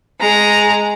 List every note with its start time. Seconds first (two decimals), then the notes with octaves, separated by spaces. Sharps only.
0.20 G#3 A#5